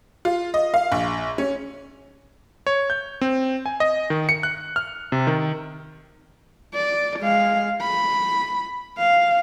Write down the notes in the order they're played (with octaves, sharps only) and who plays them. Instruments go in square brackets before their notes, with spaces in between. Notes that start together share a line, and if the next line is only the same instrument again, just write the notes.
[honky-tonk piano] F4
D#5
F5
A#1
C#4
[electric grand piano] C#5
G6
C4
G#5
D#5
D#3
C#7
F#6
F6
C3
D#3
[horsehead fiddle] D5
G#3 F5
B5
F5